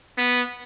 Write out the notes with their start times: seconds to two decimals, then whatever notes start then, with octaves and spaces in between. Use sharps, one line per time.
0.18 B3